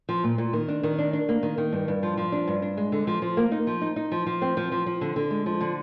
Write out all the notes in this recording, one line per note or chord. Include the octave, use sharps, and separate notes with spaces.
F3
A#2
A#2
D#3
D4
D#3
D4
D4
A#3
D#3
D#3
G2
G2
F3
F3
D4
G2
D4
G#3
D3
F3
F3
A#3
D#4
F3
D#4
D#4
F3
F3
C4
F3
F3
F3
D3
D3
G#3
F3
D3